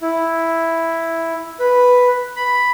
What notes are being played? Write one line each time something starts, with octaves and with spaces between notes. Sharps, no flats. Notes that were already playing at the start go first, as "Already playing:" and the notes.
E4
B4
B5